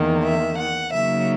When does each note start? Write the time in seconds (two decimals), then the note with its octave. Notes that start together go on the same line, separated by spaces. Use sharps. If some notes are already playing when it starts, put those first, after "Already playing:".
Already playing: E2 D#3 A#3
0.23 E5
0.57 F#5
0.92 C#3 F#3 A#3 D#4 E5